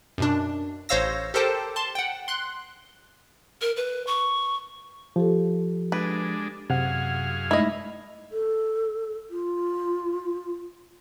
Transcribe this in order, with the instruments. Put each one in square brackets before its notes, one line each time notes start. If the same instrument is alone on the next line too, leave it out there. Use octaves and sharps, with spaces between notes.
[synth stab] F#2 B2 D4
A1 C5 C#5 F5 E6 A#6
G4 A4 A#4 C5 G5 A5
A5 C6
F#5 G5
C6 F#6
[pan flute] A#4
B4
C#6
[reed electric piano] F3 [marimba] G4 A4
[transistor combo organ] G#3 D4 [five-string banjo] B4
[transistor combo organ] F#2 G#4 F5 [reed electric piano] C3 F#5
[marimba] G#3 A3 D#4 [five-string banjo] E4 D#5
[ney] A4
F4